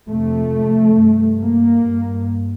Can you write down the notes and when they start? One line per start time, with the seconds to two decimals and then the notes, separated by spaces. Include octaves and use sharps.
0.09 F2 C3 A3
0.98 G2
1.42 A#3
1.86 G2